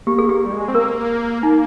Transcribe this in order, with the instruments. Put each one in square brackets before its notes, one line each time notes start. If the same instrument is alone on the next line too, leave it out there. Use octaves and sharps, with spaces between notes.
[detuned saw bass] A#3 [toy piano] G4
[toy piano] G#4
[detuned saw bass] A#3 [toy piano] G4
[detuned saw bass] G3
G#3
C4
[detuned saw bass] A#3 [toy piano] A#4
[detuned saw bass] A#3 [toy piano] D#4